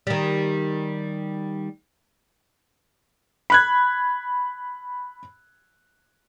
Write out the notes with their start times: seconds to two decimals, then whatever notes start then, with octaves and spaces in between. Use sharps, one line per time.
0.07 D#3 G3
3.50 B5 F#6 G#6